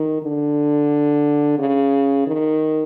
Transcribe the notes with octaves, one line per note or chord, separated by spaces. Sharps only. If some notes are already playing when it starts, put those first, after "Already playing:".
Already playing: D#3
D3
C#3
D#3